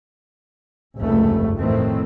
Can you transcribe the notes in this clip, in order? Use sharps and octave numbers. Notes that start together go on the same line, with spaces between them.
F1 C#2 G2 A3
F2 A2 D#3 E3 A3 C4